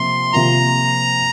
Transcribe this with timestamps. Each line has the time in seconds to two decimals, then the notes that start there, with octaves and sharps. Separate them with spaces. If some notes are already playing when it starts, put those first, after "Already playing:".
Already playing: C3 F3 A#3 C6
0.33 C3 F3 A#3 F4 A#5